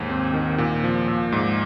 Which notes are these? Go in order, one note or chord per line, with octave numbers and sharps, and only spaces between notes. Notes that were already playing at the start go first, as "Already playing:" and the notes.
Already playing: D#2 G#2
C4
D#3
A#2
F3
A#2
G#2